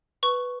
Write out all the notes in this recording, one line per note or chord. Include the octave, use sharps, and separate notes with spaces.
B4 C#6